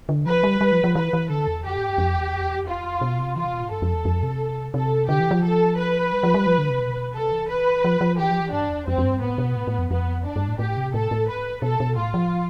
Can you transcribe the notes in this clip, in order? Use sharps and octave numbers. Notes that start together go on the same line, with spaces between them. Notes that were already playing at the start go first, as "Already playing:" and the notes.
D3
F3 B4
G3
G3
F3
F3
E3 B4
E3
D3 A4
E2
F2 G4
A2
G2
F2
E2
F2
E2
F2
E2 F4
F2
B2
C3
E3 F4
C3
B2
A2
G2 A4
F2
E2
F2
C3
C3 A4
D3 G4
E3
F3
A4
B4
G3
F3
G3
F3
D3
C3
B2
C3 A4
E3
B4
F3
F3
E3 G4
F3
E3
G2 D4
E2
F2 C4
F2
G2
A2 B3
B2
A2
A2
F2
F2 B3
D4
G2
A2
A2 G4
C3
A2 A4
A2
B4
B2 A4
B2
A2 F4
F3